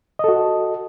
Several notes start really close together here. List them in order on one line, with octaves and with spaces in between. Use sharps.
D#5 A4 F#4